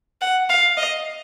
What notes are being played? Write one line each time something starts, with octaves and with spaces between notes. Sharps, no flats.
F#5
F5
D#5